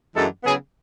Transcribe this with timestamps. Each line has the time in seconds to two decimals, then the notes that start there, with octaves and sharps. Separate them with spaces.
0.15 F#2 E3 G#3 D4 A4
0.44 C#3 F#3 B3 E4 G#4